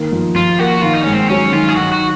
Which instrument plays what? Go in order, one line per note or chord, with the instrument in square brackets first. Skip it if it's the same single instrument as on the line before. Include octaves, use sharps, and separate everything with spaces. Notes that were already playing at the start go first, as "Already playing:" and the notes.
Already playing: [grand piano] D#3 A#3
F3
[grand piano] F3 [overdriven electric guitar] F4
[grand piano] A#3 [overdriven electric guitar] F#4
[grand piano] D#3 [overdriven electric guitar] F4
[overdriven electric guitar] D#4
[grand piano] G#2 [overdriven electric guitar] C#4
[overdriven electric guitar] C4
[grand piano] F#3 [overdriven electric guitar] C#4
[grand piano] D#3 [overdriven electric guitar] F4
[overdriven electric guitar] G#4
[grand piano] D#3 [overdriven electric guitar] F#4
[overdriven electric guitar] F#4